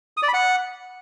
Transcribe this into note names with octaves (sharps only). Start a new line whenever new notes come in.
D#6
D5
B5
F#5